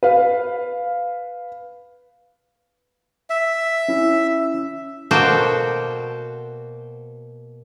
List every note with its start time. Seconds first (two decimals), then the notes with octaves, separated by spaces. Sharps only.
0.03 B4 F5
3.30 E5
3.88 C#4 E4
5.11 B2 A#3 F#4 A4 C5 G5